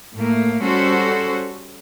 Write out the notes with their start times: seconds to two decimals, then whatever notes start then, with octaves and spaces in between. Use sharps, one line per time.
0.15 A2 A3 A#3
0.63 G3 C#4 F#4 A4 C5